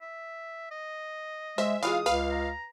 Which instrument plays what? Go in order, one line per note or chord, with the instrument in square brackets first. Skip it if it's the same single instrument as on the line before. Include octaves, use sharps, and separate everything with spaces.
[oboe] E5
D#5
[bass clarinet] G#3 [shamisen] C5 [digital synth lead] E5
[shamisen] E3 F#3 G#3 [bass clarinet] F4 [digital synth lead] F5 [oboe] D#6
[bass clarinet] C#2 [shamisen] B4 [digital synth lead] F5
[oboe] A#5